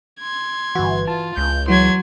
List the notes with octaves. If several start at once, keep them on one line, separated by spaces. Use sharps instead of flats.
C6 G#6
G1 E3 F#4
F4 A5
C#2 G6
E3 F#3 C6 G#6